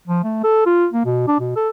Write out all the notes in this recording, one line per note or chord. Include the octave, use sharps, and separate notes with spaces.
F3
A3
A4
F4
A#3
B2
D4
B2
A4